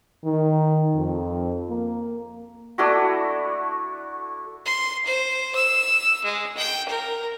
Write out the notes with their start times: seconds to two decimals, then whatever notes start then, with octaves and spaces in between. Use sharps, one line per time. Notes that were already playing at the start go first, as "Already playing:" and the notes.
0.25 D#3
0.95 F2
1.70 A#3
2.78 A3 D4 E4 F#4
4.66 C6
5.06 C5
5.55 E6
6.24 G#3
6.57 G5
6.88 A#4